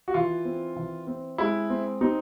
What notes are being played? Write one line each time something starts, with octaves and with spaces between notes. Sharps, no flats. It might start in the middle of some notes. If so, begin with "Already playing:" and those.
F#4
E3 F4
C4
E3
C4
G#3 E4
C4
C4 D#4